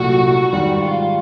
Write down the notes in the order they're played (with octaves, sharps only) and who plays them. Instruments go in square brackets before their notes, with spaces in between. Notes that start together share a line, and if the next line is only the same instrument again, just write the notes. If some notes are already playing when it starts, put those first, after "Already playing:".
Already playing: [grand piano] C2 A#2 F#3 A3 [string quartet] F#4
[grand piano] G#2 D#3 G3 [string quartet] F#4
[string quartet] F4